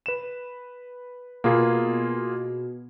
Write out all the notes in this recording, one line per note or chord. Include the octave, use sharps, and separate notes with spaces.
B4 E7
B2 A#3 F4 G#4